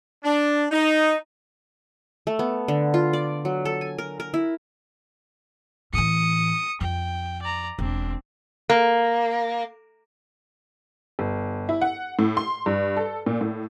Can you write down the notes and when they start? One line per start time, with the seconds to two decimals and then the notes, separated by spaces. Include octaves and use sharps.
0.24 D4
0.71 D#4
2.27 A3
2.39 B3
2.68 D3
2.94 F4
3.13 D5
3.45 F#3
3.65 A4
3.81 G#5
3.98 A#4
4.20 A#4
4.34 E4
5.94 A2 E3 D#6 C#7
6.81 F2 G5
7.42 D5 A#5
7.79 E1 C4 D4
8.69 A#3
11.19 G1
11.69 E4
11.81 F#5
12.19 A2
12.37 C6
12.66 G2
12.97 A4
13.26 A#2
13.41 A2